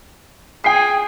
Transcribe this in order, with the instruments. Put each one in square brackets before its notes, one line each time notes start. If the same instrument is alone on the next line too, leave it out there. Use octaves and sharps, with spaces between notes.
[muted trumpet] G#4 [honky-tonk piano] G5 C7